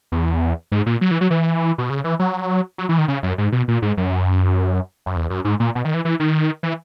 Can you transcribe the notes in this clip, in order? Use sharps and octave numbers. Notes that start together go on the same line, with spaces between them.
E2
G#2
A#2
F#3
E3
F#3
E3
B2
C#3
E3
F#3
F#3
E3
D#3
C#3
F#2
G#2
B2
A#2
G#2
F#2
F#2
E2
F#2
G#2
A#2
B2
D#3
E3
E3
D#3
E3